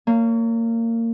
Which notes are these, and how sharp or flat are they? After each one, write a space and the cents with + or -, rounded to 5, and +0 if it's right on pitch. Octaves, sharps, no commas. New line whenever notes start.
A#3 -25 C#5 +30